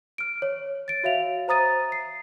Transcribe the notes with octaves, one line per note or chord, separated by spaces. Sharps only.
F6 D7
C#5
A6 D7
F#4 C#5 E5 F5 F7
C5 A#5 D#6 A6 D#7
C7